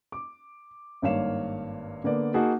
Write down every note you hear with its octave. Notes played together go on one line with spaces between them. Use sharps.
D6
G#1 G2 A#3 C#5 F5 E7
D3 A#3 B3 D5
A#3 D#4 F#4 G#4 F#5 A5